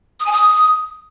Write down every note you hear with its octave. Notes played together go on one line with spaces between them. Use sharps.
D#6
G#5
D#6